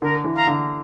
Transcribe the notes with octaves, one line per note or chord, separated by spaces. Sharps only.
D3 A#4
E3
F5 A#5
D3